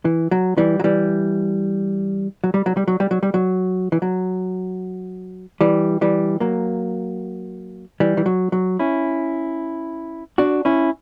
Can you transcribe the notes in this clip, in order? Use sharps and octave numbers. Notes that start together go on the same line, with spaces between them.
E3
F#3
E3 G3
F#3
E3 G3
F#3
G3
F#3
G3
F#3
G3
F#3
G3
F#3
E3
F#3
E3 G3
E3 G3
F#3 A#3
E3 G3
E3
F#3
F#3
C#4 E4
D4 F#4
C#4 E4